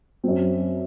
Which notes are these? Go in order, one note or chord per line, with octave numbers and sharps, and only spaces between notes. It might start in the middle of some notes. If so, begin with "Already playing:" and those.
F#2 F#3 C4